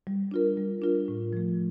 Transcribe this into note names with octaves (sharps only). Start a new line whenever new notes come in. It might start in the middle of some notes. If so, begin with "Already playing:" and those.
G3
D4 F4 A#4
G3
D4 F4 A#4
A2
F3 A3